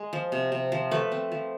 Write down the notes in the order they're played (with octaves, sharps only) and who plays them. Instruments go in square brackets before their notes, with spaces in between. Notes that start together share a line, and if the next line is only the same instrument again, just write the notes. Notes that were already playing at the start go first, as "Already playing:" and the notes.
Already playing: [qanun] G#3
F3
C3
C3
F3
A3 B4
C4
F3